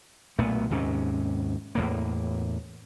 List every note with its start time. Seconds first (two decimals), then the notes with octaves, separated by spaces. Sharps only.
0.39 B1 A#2 A3 B3
0.70 D#2 G#2 C3 C#4
1.75 E2 A2 A#3